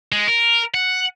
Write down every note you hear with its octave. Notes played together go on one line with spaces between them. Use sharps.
G#3
A#4
F#5